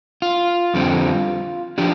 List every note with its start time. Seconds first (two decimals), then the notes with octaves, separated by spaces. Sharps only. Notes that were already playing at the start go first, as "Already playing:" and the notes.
0.22 F4
0.74 F2 D3 G3 C4
1.78 F3 D4 G4